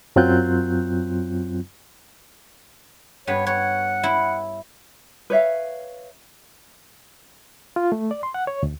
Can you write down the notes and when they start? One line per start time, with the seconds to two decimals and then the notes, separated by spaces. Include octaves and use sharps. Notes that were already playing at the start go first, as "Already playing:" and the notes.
0.16 F#2 F#3 C4 F4 F#6 G6
3.27 G2 B3 C#5
3.47 C#5 F#5
4.03 E4
5.30 B4 C#5 E5 F5
7.76 F4
7.92 A3
8.11 D5
8.23 C6
8.34 F#5
8.47 C#5
8.63 D2